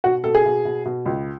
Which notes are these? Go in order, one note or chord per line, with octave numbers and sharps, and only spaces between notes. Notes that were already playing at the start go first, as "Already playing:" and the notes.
B2 F#4
B2 A4
G#4
B2
B2
B2
C#2